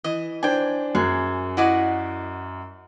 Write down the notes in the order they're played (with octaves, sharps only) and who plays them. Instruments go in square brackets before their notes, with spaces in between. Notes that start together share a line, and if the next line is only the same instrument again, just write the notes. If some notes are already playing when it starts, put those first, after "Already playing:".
[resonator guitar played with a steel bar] E3 [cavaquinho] D#5
[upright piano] D4 C5 [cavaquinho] G5 G#5
[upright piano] F#2 [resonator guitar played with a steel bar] F#4 [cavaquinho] G#4
[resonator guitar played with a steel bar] E4 D#5 [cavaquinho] F#4 D5 F#5